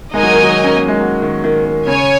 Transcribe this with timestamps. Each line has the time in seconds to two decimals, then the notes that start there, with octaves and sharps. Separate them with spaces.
0.14 G#3 D#4 A#4 D#5 G#5
0.23 F#3
0.33 D#3
0.43 F#3
0.64 C#4
0.76 A#3
0.88 G#3
1.00 F#3
1.22 D#3
1.44 D#3
1.66 D#3
1.87 C#3 C#5 G#5